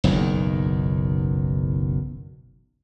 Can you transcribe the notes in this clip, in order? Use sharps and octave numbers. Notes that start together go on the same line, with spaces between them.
F#1 B1 E2 D#3